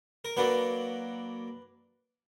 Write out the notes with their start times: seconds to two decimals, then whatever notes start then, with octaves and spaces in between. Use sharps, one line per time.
0.25 A#4
0.37 F#3 A#3 D4 B4